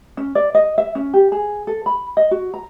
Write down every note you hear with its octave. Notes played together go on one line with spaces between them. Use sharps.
C#4
D5
D#5
E5
C#4
G4
G#4
A4
B5
D#5
F#4
A#5